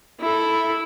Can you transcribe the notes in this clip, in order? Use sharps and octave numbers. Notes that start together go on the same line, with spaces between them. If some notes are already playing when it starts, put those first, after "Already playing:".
E4 A4